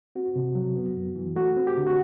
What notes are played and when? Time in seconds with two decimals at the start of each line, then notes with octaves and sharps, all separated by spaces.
0.15 C4 F#4
0.36 C3
0.55 F#3
0.76 B3
0.97 F#2
1.16 E3
1.36 A3 F#4
1.57 C4
1.67 G4
1.77 D3
1.87 F#4